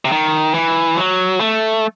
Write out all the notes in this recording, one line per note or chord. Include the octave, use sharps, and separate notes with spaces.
C3
D#3
E3
F#3
A3